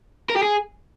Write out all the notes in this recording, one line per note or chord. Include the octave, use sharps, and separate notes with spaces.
A#4
G4
G#4